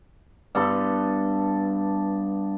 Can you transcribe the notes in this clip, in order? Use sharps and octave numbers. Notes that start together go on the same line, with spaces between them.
G2 B3 A4 C6